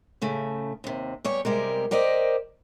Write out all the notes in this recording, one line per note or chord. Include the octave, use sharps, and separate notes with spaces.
A2 C#3 A3
D#2 C3
E2 G3 C#5
C3 G3 G#3 A#4
G4 A#4 C5 D5 D#5